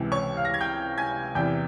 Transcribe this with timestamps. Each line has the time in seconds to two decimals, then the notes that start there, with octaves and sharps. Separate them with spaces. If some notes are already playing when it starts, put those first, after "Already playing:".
Already playing: C#2 C3 E3
0.12 C#5 C#6
0.37 F5 F6
0.45 A#6
0.54 G#6
0.61 G5 G6
0.98 G#5 G#6
1.35 E2 C3 E3 G5 G6